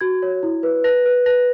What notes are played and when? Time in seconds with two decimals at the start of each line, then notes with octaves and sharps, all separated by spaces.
0.01 F#4 G#6
0.23 C#5
0.43 E4
0.63 B4
0.84 B4 A#6
1.06 B4
1.26 B4 A#6